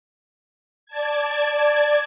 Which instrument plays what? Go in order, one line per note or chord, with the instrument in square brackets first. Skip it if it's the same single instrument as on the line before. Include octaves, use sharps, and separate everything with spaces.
[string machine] D5 A5 G#6